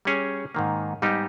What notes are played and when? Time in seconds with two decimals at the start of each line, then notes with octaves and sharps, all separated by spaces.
0.05 G3 C#4 G#4 C#5
0.55 G#2 D#3 A#3
1.02 G#2 G3 B3 D#4 G4